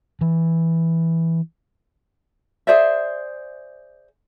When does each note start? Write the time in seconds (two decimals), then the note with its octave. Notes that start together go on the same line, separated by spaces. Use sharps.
0.21 E3
2.67 G#4 C5 D5 E5